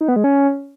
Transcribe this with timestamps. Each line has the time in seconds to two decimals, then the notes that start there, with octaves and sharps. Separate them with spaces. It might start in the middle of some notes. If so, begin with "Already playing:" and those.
0.01 D#4
0.08 B3
0.16 G#3
0.24 C#4